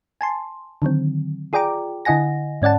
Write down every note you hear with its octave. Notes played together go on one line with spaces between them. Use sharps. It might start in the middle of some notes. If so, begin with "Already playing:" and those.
G#5 A5 C6
D3 D#3 F#3 C4
F4 G#4 D5 G5 A#5 D6
D3 E4 D#5 F#5 G#5 A#6
G#2 C#4 D5 F#5 A5